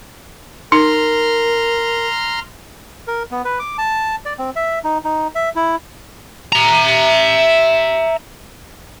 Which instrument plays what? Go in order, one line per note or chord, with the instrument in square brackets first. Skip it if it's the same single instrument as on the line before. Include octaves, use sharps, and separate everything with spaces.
[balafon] D#4 [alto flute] A#4 [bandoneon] A#5 C6 F6
[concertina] A#4
B3
B4
D6
A5
D5
C4
E5
D#4
D#4
E5
E4
[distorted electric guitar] E5 A#5